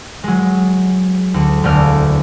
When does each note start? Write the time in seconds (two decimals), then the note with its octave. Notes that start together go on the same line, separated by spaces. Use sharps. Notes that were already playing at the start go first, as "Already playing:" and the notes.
0.24 F#3 G#3
1.34 D2
1.64 E1 D2 A3 D5 F6